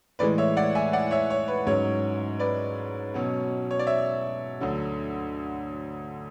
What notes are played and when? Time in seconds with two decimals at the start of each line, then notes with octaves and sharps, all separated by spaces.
0.19 A2 E3 G#3 B4 D5
0.38 C#5 E5
0.57 D5 F#5
0.75 E5 G#5
0.93 D5 F#5
1.11 C#5 E5
1.30 C#5
1.48 B4
1.66 G#2 F#3 C#4 C#5
2.39 B4 D5
3.14 B2 F#3 C#4
3.71 C#5
3.79 D5
3.87 C#5 E5
4.60 D2 D3 F#3